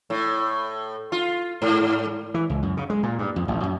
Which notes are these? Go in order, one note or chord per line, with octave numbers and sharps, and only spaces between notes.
A2
F4
G#2
E3
C#2
F#2
C#3
G#3
A#2
G2
F2
A1
F#2